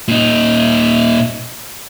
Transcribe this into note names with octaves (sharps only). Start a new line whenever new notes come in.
A#2 D#4